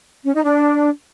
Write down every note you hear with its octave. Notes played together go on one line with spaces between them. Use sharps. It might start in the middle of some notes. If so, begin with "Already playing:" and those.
C#4
D#4
D4